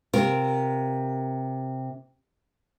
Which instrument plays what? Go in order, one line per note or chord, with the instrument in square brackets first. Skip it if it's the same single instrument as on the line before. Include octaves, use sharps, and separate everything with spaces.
[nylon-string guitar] C3 F4 A#4